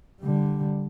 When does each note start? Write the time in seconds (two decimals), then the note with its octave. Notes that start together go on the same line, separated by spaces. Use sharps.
0.21 D3 G3